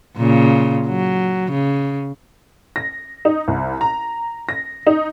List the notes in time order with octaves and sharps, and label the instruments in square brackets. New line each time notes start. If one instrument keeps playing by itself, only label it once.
[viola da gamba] A#2 C#3
F#3
C#3
[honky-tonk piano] A#6
D#4
C2
A#5
A#6
D#4